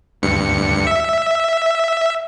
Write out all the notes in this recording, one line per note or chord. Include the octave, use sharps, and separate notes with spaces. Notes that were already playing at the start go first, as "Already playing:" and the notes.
D2 G2 C#7
E5